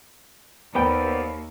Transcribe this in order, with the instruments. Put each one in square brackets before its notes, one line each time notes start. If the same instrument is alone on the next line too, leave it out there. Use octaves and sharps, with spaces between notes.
[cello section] D#2 [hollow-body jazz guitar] B3 G5 [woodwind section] C5 D5 [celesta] B5